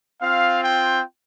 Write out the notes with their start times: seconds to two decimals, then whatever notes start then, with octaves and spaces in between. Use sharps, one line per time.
0.22 C4 F4 F5
0.64 G5